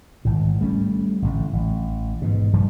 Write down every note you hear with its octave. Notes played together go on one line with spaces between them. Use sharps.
G#1 A2
G3 A3 C#4
A1 A2 D3
A1
G#2 B2
F1 G2 F3 G3